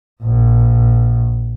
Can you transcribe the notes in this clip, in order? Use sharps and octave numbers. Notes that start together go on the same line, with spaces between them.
A#1